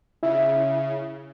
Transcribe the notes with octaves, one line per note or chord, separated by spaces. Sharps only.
C#3 E4 E5